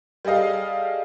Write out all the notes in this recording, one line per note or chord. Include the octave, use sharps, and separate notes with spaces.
G3 G#4 A4 D#5 F5